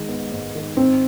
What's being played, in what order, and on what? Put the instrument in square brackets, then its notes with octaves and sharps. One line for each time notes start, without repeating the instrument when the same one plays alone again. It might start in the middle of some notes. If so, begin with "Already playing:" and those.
Already playing: [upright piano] G#2 D#3 G#3
B3
G#2
D#3
[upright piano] G#2 [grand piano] C4